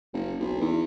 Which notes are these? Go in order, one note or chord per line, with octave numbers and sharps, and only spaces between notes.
F#1
B1
E2